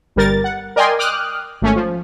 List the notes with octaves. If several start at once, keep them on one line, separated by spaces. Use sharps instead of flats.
G1 G3 A#4 A6
F#5
A#4 D5 D#5 G5 G#5 C6
G5 D6 D#6 F6 F#6
G#1 A3 C#4
F3